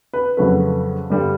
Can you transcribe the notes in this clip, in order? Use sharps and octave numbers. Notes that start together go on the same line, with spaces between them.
B4
F2 C#3 F#3 A3 B4
G2 D3 G3